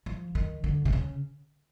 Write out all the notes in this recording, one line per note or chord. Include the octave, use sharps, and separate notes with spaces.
F3
D#3
D3
C3
C#3